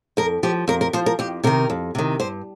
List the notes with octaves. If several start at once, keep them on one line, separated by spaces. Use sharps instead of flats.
F2 A#4
F3 G4
F2 A#4
A#4
F3 C5
A#4
F2 G4
C3 D#3 A#4
F2
C3 D#3
G2 C5